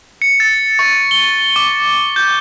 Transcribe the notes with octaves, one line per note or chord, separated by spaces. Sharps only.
C#7
A6
C#6
G7
D6
G6